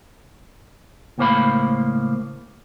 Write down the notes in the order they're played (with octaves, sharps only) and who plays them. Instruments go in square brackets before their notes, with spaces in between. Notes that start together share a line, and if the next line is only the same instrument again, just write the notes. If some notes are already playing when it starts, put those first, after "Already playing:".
[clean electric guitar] C#2 A2 A#3 C5 F5 B5